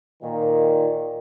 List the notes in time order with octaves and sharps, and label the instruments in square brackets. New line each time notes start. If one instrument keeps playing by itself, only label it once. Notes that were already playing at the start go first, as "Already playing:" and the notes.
[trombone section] A#2 D#3